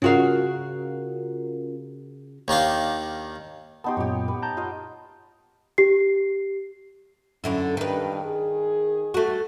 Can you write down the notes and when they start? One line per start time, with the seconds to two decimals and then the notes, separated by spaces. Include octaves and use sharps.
0.02 C#3 C#4 F4 F#4 A#4 F5
2.48 D#2 D#3 D4 F5
3.84 B3 D#4 G4 A5 C6
3.97 F#2 A#2 G4 C#5
4.28 B4
4.42 A5 A#5 G6
4.57 F4 D#5
5.78 G4 C7
7.44 F#2 D3 E4
7.77 G2 D#3 B4
8.24 G#4
9.14 A3 F#4